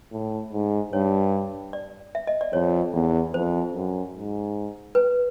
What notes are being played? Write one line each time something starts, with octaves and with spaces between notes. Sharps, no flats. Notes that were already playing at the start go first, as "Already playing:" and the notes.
A2
G#2
G2 C#5
D5
E5
D#5
D5
F2 C#5
E2
F2 C5
F#2
G#2
B4